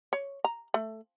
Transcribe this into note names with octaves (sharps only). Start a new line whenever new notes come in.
C#5
A#5
A3